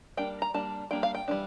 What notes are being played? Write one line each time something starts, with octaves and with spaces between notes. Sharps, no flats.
G3 A#3 D4 G5
A#5
G3 A#3 D4 A5
G3 A#3 D4 G5
F5
G5
E3 G3 A#3 D4